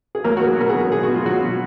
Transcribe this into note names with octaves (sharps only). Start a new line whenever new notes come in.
G#4
F#3 A#3 A#4
F#3 F#4
G#3 G#4
B2 A#4
G#3 G#4
F#3
B2 G#4
B2 F#4
F4
B2 F#3 F#4
B2